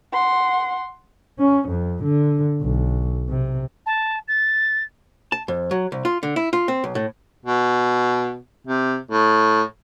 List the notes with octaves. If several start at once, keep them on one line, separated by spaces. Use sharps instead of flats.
F#5 C6
C#4
F2
D3
B1
C3
A5
A6
A5
F2
F#3
C2
F4
D3
E4
F4
C4
B1
A2
B2
C3
A2